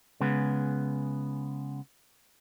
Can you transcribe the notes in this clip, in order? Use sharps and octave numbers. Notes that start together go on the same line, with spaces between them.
C#3 G#3 B3